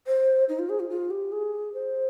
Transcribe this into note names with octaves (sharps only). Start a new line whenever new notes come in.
C5
D#4
F4
G#4
F4
F4
G4
G#4
C5